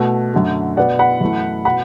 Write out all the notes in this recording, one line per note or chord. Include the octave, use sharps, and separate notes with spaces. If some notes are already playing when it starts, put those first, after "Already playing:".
Already playing: B2 A3
F#2 D3 A3
B2 B3 D5 F#5
F#5 B5
F#2 E3 A3
B2 F#5 B5